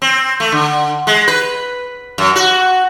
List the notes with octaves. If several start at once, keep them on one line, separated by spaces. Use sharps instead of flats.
C4
A3
D3
G#3
B4
F#2
F#4